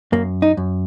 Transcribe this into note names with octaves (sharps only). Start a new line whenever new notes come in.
F#2 A#3
D#4
F#2